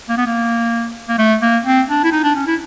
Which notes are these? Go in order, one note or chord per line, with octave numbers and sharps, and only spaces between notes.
A#3
B3
A#3
A#3
A3
A#3
C4
D4
E4
D#4
D4
C#4
E4